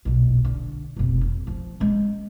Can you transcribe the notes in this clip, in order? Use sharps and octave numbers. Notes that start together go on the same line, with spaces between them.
D#1 B1
D3
F1 B1
F2
F3
G#3 C#4